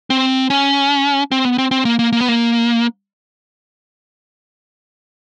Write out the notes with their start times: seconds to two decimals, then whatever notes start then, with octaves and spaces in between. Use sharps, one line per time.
0.10 C4
0.50 C#4
1.31 C4
1.45 B3
1.58 C4
1.71 C4
1.85 A#3
1.99 A#3
2.13 A#3
2.21 B3
2.28 A#3